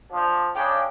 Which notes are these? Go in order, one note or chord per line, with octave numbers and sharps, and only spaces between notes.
F3 D4
C#3 D4 G5